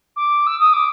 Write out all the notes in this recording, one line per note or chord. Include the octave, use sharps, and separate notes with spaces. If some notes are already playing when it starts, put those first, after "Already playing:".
D6
E6
D#6
D6